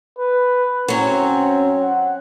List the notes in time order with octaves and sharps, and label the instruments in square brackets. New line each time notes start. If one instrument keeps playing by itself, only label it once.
[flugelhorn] B4
[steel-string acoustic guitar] F#3 C#4 [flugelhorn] C4
[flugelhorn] F#5